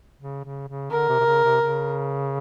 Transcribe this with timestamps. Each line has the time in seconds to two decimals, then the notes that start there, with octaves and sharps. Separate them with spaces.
0.20 C#3
0.44 C#3
0.68 C#3
0.91 D3 A#4
1.09 C3
1.20 C3
1.26 C#3
1.44 C3
1.62 C#3